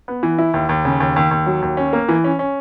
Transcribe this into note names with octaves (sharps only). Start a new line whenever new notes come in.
B3
E3
E4
D#2
D#2
C#3
D#2
D#2
D#2
F#3
D#2
C#4
A#3
E3
C#4
C#4